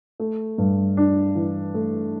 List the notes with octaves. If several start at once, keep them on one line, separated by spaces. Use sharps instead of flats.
A3
G2
D4
E3
A3